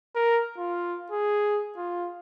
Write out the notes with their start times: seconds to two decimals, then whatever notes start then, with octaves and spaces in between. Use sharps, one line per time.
0.15 A#4
0.58 F4
1.12 G#4
1.77 F4